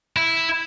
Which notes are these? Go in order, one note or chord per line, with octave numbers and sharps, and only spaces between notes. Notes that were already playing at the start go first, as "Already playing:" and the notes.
E4